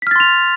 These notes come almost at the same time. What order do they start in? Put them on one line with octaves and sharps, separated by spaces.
B6 F6 A6 C6 F7